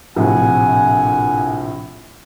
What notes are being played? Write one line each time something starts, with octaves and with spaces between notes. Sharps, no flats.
A#1 A2 C3 F#5 G#5